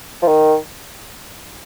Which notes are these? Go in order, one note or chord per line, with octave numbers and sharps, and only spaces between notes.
F3
D#3